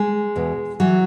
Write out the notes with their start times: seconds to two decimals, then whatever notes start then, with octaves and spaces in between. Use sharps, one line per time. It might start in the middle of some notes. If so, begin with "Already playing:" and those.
Already playing: G#3
0.36 E2 B2
0.80 E3 F#3